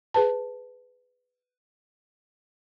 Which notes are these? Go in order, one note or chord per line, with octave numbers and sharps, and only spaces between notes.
G#4 B4 A5